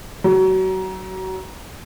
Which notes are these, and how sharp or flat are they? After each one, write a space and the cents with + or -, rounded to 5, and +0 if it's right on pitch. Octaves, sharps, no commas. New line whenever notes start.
F#3 +30